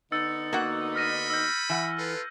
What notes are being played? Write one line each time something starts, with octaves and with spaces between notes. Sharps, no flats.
D3 B3 D#4 E6 A6 C#7
A#3 F#4 F#5
B5 F6 A#6 D#7
E6 G6
E3 F#5
F4 A4 B4